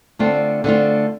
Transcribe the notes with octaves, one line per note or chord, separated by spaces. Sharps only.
D3 A3 C4 F4
D3 A3 C4 F4